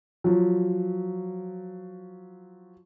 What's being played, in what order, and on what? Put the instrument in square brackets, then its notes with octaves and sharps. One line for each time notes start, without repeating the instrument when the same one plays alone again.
[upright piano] F3 F#3